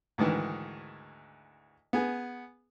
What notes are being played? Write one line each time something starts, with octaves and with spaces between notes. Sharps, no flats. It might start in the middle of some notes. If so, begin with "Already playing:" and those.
D2 G#2 D#3 E3
B3 G#4